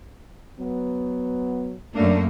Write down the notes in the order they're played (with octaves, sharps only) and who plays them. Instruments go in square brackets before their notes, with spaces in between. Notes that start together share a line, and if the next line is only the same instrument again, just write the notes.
[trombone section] F#3 B3
[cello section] F#2 A3 A#3 [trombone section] D4